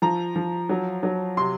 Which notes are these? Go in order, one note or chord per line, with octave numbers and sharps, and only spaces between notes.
F3 A#5
F3
F#3
F#3
C3 C6